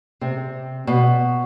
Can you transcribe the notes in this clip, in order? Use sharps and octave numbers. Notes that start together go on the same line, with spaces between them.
C3
B2